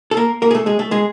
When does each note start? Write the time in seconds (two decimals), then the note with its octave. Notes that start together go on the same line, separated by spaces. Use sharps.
0.11 A4
0.17 A#3 A#4
0.42 A#3 A#4
0.51 G#4
0.55 A3 A4
0.66 G#3 G#4
0.79 A3 A4
0.91 G#3 G#4